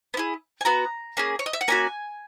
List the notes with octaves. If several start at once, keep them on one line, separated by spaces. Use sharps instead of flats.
B3
E4 G#4
G#5
B3 F#4 A#5
A#3 C#4 G#4
C#5
D#5
E5
F#5
A#3 C#4 F#4 G#5